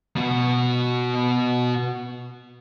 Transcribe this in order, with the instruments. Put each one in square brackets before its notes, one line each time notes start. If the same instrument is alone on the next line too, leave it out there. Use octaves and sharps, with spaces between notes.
[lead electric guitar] B2 F#4